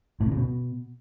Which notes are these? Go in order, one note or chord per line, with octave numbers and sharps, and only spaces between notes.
A2
C3
C#3
B2